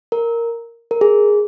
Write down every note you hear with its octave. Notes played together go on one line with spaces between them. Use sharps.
A#4
A#4
G#4